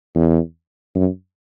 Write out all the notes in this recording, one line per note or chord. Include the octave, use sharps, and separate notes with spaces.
E2
F#2